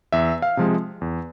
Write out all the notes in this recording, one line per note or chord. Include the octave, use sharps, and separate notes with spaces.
E2 E5
F5
C3 F3 G#3
E2